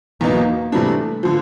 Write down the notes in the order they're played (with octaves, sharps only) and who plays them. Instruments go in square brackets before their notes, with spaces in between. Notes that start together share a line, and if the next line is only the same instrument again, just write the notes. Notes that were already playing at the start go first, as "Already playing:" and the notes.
[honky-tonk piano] E2 B2 F#3 B3 D#4 [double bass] A#3
[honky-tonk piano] C3 E3 G3 B3 D4 [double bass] A3
[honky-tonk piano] D3 F3